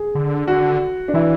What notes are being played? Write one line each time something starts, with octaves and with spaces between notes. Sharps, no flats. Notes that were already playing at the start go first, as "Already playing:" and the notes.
Already playing: G#4
D3
D3 F#4
D4
E3 E4